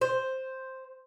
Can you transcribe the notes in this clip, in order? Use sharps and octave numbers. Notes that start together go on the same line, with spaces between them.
C5